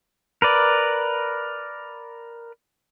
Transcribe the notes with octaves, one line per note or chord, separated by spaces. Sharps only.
A#4 B4 D5